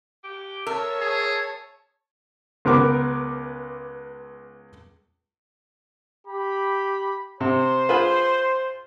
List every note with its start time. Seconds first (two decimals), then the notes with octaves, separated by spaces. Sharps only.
0.24 G4
0.67 A#4 C#5 E5 A5
1.00 G#4
2.65 C#2 B3 A#4 D6
6.27 G4 B5
7.40 C3 C5
7.89 F4 G#4 B4